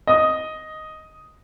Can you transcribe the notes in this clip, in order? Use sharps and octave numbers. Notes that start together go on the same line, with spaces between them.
D#5 D#6